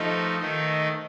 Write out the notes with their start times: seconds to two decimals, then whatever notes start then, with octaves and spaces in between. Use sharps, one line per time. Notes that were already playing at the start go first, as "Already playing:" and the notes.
Already playing: F3 A3 D#4 C5 D#5 F5
0.40 D#3 A3 D#4